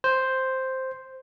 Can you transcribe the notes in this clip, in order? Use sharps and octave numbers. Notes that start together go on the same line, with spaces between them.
C5